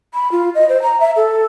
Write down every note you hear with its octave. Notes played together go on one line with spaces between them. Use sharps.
B5
F4
D#5
C5
A#5
E5
A4